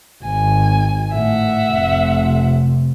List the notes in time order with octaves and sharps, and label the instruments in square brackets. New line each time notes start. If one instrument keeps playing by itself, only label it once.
[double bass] G#1 [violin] G#5
[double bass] A2 [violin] E5 F#5
[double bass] F1 C3